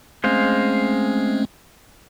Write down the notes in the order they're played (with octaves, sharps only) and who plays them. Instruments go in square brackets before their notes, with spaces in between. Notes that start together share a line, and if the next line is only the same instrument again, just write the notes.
[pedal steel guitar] G#3 C5 F5 [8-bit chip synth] A3 C4 C#4